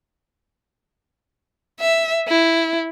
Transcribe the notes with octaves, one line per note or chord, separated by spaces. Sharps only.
E5
E4